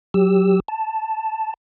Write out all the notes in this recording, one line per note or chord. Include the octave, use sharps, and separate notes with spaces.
F#3 G4 E6
A5